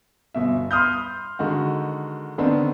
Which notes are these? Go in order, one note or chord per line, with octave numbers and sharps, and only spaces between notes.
G1 B2 E5
B5 C6 D#6 F6 G6
D3 D#3 G#3 F#4
D3 D#3 B3 C4 D4